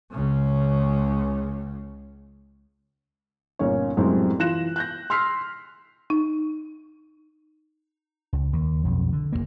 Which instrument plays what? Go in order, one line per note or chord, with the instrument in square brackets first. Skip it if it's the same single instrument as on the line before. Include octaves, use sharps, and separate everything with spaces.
[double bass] C#2 C#3
[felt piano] G1 A#2 C#4 C#5
F#2 A2 C3 G3 G#3 C4
E3 F4 F#6 A#6 E7
F#6 G6 A#6
C6 E6 F6 B6 C7
[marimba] D#4
[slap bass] C#2
D#2
B1 F2
D3
F#1 G2 A#3